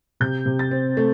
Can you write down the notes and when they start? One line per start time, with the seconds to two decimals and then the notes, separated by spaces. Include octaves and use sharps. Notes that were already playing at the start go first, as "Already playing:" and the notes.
0.20 C3 G6
0.46 C3
0.59 A6
0.71 C4
0.97 A3